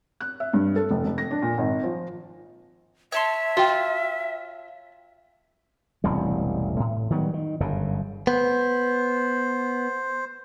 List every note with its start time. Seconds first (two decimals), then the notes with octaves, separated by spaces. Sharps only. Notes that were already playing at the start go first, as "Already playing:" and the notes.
0.20 F#6
0.40 E5
0.53 G2
0.76 A4
0.91 F1
1.05 F1
1.18 A#6
1.31 D4
1.42 A#2
1.58 G#1
1.83 F3
3.12 C#5 E5 A5 C6
3.57 F4 F#4 G5
6.04 E1 A1 C3 G3
6.80 A2
7.10 D#3 F#3 G3 B3
7.34 D#3
7.60 G1 F#2 C#3
8.27 B3 C5